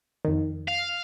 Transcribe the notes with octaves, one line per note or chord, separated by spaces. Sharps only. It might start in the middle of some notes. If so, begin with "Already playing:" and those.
F2 D#3
F5